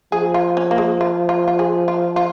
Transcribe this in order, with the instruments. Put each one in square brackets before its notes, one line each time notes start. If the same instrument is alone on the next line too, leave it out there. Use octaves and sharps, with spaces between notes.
[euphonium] F3 [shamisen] G#4
[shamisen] F4
C#4
A#3
G#3
F4
F4
F4
G#4
F4
F4